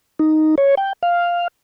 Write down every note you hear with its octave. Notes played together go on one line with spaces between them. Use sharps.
D#4
C#5
G5
F5